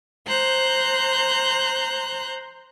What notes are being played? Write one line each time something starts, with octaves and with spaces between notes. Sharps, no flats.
C5 A#5 F#6 G6